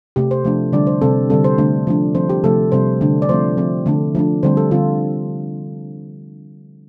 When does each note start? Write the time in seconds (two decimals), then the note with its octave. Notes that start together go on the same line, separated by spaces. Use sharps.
0.16 C3 A3 C4 G4
0.31 C5
0.45 F3 A3 D4
0.73 D3 G3 D4 D5
0.87 C5
1.01 C3 G3 C4 A4
1.30 D3 G3 C4 A4
1.44 C5
1.58 D3 A3 D4
1.87 F3 A3 D4
2.15 F3 C4 C5
2.29 G4
2.44 C3 F3 A3 A4
2.72 C3 G3 C4 C5
3.01 D3 A3 D4
3.22 D5
3.29 F3 A3 C4 C5
3.57 F3 C4
3.86 D3 A3 D4
4.15 F3 A3 D4
4.43 D3 G3 C4 C5
4.57 A4
4.71 D3 G3 C4 F4